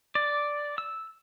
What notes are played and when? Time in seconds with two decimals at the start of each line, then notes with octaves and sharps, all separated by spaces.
0.15 D5
0.78 E6